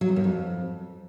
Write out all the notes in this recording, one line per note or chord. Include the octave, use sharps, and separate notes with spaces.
F#3
E2
F#2
F2